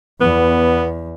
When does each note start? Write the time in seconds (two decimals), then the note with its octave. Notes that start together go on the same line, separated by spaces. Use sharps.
0.21 E2 B3